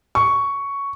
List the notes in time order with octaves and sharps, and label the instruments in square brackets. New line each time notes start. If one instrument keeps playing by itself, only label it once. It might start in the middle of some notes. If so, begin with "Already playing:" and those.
[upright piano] C#6